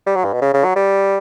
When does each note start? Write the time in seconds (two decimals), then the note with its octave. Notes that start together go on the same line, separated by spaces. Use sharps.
0.07 G3
0.16 F#3
0.25 G2
0.33 B2
0.41 C#3
0.54 C#3
0.64 F#3
0.76 G3